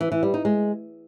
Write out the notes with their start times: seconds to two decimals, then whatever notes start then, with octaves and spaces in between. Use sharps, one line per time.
0.01 E3
0.12 E3
0.23 G3
0.34 D#4
0.45 G#3